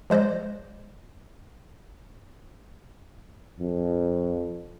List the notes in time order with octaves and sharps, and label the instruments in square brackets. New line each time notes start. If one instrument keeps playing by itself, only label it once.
[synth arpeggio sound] F3 G#3 C5 D5 D#5
[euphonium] F2